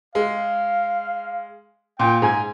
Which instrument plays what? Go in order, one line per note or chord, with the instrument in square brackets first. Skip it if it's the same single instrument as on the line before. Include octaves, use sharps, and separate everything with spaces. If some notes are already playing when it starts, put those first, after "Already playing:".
[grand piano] G#3 [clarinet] F5
[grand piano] A#2 [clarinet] G5
[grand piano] G#2 [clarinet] G#5